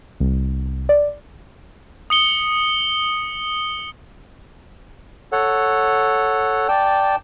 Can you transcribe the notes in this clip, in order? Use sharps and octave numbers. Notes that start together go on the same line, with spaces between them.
C2
D5
D#6 C#7 G7
A4 C#5 F#5
D5 G5 A5